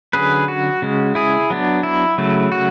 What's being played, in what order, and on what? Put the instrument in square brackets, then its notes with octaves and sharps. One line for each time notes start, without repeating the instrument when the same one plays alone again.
[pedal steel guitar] D3 F#3 C#4 G#4 B4
F#4
C#3 G#3 C#4
E4 G#4
F#3 B3 D4
E4
C#3 F#3 A3
F#4